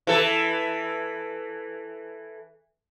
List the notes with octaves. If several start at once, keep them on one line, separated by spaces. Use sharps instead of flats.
E3 A4